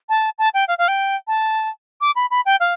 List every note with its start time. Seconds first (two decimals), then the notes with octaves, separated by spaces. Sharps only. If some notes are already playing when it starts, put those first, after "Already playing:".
0.09 A5
0.38 A5
0.54 G5
0.68 F5
0.78 F5
0.88 G5
1.27 A5
2.01 D6
2.16 B5
2.31 B5
2.46 G5
2.60 F5